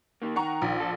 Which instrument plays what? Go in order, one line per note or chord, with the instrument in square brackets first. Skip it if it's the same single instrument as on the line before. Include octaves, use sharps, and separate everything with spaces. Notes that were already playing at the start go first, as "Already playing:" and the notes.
[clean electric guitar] D#3 A#3
[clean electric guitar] D#3 [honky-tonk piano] F#5 A#5 C#6
[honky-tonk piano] A#1
[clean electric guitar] A4